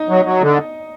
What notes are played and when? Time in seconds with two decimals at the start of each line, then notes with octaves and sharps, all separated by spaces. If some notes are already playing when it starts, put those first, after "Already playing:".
Already playing: D#4 D#5
0.09 F#3
0.25 F#3
0.41 D3